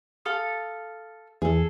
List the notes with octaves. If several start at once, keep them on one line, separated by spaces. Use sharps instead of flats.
A4 F5 D#6
E2 G#4 A4